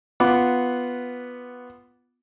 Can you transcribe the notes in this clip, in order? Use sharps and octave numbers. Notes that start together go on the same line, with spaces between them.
B3 F4 F#5 D6